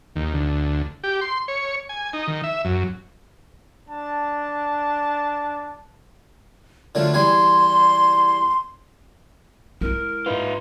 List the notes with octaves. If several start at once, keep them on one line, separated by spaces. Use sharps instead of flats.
D#2
D2
G4
C6
C#5
G#5
D#4
D#3
E5
F#2
D4 A5
D3 F#3 A3 F4
E2 G3 G#5 C6
G#3 E4 A#4
G#2 D#4 F4 B4